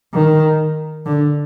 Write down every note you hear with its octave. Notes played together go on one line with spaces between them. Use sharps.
D#3
D3